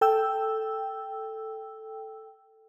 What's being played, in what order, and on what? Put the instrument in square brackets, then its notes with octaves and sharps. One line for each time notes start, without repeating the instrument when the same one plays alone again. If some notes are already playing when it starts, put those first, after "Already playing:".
[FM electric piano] A4 G5 E6